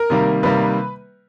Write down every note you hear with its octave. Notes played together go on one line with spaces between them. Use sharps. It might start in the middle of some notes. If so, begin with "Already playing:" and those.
Already playing: A#4
C3 D#3 G3 A#3
C3 D#3 G3 A#3 B4